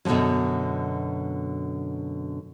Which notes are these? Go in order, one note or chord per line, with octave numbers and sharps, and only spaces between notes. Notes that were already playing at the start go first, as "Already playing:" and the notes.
F#2 B2 D3 F3 F#3